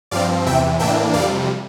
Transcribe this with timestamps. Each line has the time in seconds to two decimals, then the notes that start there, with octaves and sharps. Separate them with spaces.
0.11 G2 F3 C4 D5 F5
0.46 E2 C3 E3 E5 G5
0.79 A2 E3 A#3 D4 E5 G5
1.14 F2 C3 G3 D5 F5